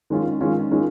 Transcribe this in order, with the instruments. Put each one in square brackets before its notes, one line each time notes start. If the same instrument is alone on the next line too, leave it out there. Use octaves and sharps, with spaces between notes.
[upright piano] D#3 G#3 C#4 F4
D#3 G#3 C#4 F4
D#3 G#3 C#4 F4